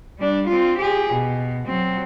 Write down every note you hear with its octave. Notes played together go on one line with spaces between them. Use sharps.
G3 D4
C4 F4
G4 G#4
B2
F#3 C4